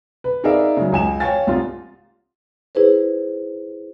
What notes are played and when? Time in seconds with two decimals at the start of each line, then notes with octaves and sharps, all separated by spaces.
0.24 B4
0.44 D#4 G#4 A#4 D5 E5 F5
0.77 C#3 F#3
0.92 C#2 G#5 E7
1.20 C#5 F5 G5 G#5 A6
1.47 C2 F4
2.75 E4 G#4 B4 C5